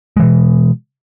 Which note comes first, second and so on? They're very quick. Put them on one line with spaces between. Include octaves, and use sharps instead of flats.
G#3 E3 B2